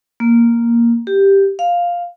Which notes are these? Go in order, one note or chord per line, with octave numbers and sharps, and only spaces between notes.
A#3
G4
F5